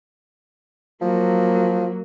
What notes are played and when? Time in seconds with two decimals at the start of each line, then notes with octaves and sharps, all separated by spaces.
1.02 F3 F#3 A#3